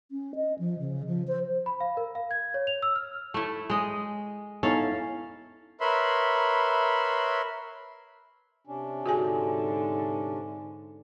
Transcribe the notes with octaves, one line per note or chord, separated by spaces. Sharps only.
C#4
D#5
F3
C#3
F3
C5
B5
F5
A#4
F5
G#6
C#5
F7
E6
F6
A3 E4
G#3 D#5
B3 C#4 D#4 E4 A4 F5
A#4 B4 C#5 E5 B5 C6
C3 C#4 D4
G#2 D3 F#4 G#4 G#5